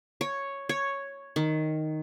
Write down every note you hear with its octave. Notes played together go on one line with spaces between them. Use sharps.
C#5
C#5
D#3